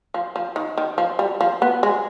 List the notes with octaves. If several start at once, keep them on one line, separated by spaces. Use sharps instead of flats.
F3
F3
D#3
D#3
F3
G3
F3
B3
G#3